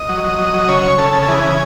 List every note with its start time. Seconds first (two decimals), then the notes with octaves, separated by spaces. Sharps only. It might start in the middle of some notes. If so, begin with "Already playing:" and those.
Already playing: D#5
0.09 F#3
0.24 F#3
0.38 F#3
0.53 F#3
0.68 C#3 C#5
0.83 C#3
0.98 C#3 A4
1.13 C#3
1.22 A4
1.28 E3 G#4
1.43 C#3